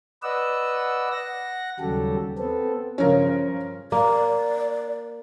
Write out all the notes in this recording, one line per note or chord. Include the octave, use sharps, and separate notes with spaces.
B4 D5 D#5 F#5 E6
F#5 A#6
D#2 C#3 F#3 G3 G4 A4
B3 C4 A4
G2 C#3 F3 C#4 A#4
A#3 D5